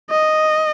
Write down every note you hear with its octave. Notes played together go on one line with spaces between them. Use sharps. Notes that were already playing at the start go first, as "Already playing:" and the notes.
D#5